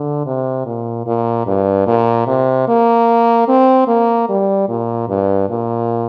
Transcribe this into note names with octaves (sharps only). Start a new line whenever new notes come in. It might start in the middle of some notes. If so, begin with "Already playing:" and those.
Already playing: D3
C3
A#2
A#2
G2
A#2
C3
A#3
C4
A#3
G3
A#2
G2
A#2